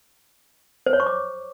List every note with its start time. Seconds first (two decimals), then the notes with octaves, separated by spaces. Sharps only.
0.86 C5
0.93 C#5
1.00 C#6
1.06 D6